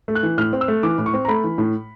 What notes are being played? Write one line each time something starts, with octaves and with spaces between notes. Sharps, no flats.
A3
F#6
E3
A2 F6
C4
E6
A3
E3 D6
A2
C#6
C4
A#5
A3 B5
E3
A2